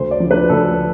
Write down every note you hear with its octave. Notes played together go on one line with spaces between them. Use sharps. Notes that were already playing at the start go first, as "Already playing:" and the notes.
Already playing: D2 C5
D5
F3
D3
B4
D2 A4